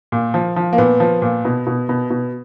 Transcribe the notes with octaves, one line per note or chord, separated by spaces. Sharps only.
A#2
F3
F3
A#3
A#2 B3
F3
A#2
B2
B2
B2
B2